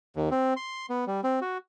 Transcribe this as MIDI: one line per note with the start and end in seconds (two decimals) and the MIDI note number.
0.16 0.29 39
0.31 0.54 60
0.57 0.86 84
0.90 1.05 59
1.07 1.21 55
1.24 1.40 60
1.42 1.58 66